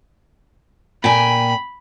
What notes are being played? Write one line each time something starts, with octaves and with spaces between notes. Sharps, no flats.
A#2 G5 G#5 B5